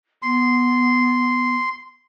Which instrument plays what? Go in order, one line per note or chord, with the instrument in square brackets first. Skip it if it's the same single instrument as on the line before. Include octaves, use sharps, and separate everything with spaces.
[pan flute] B3 [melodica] C6